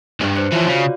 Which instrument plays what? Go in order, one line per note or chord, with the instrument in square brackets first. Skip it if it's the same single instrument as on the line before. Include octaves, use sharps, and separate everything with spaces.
[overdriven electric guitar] C#2 G2
[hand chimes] C5 F#6 C#7
[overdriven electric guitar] E3 F3 [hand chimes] F4 C#5
[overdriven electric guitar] C#3 [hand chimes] F#4 D5 F5